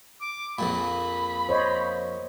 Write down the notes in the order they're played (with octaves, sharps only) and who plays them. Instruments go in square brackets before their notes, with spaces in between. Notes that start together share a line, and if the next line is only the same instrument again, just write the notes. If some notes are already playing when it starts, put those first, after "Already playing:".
[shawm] D6
[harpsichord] A#1 F2 A#2 [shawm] B5
[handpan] C5 C#5 D#5